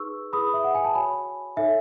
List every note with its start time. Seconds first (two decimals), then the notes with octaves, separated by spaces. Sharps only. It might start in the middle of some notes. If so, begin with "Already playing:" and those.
Already playing: D#4 G#4 B4 C#6 E6
0.33 E4 G#4 B4 B5 D#6
0.54 E5
0.64 F#5
0.75 G#5
0.84 A5
0.95 F#4 C#5 G#5 B5
1.56 D#4 A4 C#5 E5 G#5